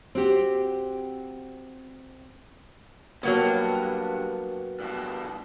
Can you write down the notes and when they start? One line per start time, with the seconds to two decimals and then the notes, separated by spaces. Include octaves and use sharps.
0.15 C4 F#4 G4
3.23 G2 F#3 A#3 B3
4.80 G2 B2